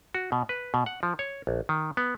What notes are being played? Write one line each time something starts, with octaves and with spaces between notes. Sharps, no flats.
F#4
B2
B4
B2
F#5
F3
C#5
A#1
D#3
B3